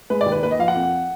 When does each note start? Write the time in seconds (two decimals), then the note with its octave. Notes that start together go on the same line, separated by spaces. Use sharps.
0.10 G#3 B4
0.21 D5
0.26 D#2
0.32 B4
0.43 A#3 B4
0.51 D#5
0.59 F3 F5
0.68 F#5
0.75 F2